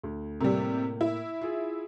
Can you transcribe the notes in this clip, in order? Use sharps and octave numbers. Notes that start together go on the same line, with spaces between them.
D2
A2 C3 G3 A#3
E4
F4 G#4